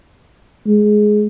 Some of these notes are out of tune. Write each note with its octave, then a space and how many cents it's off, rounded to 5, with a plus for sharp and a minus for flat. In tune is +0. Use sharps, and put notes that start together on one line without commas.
G#3 +15